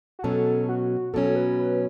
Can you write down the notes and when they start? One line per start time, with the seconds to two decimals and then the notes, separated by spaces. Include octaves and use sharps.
0.19 F#4
0.24 B2 F#3 C#4 A4
0.69 F#4
1.14 B2 F#3 C#4 A4
1.36 B4
1.59 B4